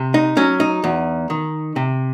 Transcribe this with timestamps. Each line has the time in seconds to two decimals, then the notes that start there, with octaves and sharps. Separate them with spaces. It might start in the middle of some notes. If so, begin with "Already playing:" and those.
Already playing: C3
0.14 D#4
0.37 F#3 C#4
0.60 D#4
0.84 E2
1.30 D#3
1.76 C3